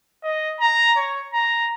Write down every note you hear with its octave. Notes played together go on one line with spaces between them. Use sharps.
D#5
A#5
C#5
A#5